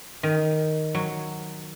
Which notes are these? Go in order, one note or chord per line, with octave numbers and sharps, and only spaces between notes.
D#3
F#3